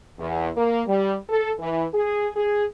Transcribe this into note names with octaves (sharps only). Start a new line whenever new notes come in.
E2
A#3
G3
A4
E3
G#4
G#4